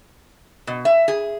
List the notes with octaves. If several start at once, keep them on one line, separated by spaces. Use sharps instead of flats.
B2
E5
G#4